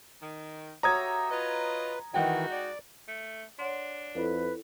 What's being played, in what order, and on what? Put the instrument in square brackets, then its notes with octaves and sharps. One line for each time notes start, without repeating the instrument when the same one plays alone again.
[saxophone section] D#3
[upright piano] F#4 C#5 [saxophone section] G4 A4 E5 [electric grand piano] A#5 D#6 G#6
[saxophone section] F4 D#5 [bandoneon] B4
[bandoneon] D#3 E3 [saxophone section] G#3 D#4 F#4 [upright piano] D#5 F#5 G5
[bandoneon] D5
[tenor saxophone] A3
[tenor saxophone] D4 [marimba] C#5 F#5 C6
[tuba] F2 [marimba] E4 A4 [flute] B4